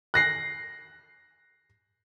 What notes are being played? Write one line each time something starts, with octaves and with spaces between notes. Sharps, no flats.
F#6 A#6 C7